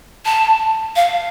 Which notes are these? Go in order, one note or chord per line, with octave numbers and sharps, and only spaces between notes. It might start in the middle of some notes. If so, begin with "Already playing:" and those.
A5
F5